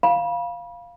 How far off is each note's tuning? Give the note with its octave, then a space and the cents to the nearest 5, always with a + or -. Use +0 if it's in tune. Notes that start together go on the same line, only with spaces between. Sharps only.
F5 +0 B5 -30